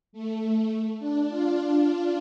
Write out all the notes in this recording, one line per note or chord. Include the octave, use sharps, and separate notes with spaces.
A3
D4
F4